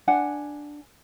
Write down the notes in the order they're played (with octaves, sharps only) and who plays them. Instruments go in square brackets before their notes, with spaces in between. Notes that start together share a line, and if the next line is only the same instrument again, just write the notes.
[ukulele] D4 F#5 G#5